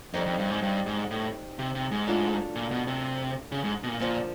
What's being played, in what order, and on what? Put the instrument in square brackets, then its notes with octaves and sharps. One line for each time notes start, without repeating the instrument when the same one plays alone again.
[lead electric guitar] F2 [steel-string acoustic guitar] G3 C4 D#4
[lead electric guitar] F2
G2
G#2
G2
G#2
A2
C3
C3
G#2
[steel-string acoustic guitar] F#3 A3 D4 F4 A4
[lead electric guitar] A#2
B2
C3
C#3
G#2
B2
A#2
[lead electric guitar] A#2 [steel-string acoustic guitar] D3 F3 A#3